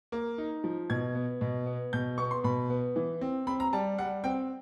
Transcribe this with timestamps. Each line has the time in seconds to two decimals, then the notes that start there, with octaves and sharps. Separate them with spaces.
0.12 A#3
0.38 D#4
0.64 F3
0.90 B2 G#6
1.15 B3
1.41 B2
1.66 B3
1.93 B2 G6
2.18 B3 C#6
2.31 C6
2.44 B2 B5
2.70 B3
2.96 E3
3.21 C4
3.47 C4 B5
3.60 A#5
3.73 G3 A5
3.98 G3 F#5
4.24 C4 G5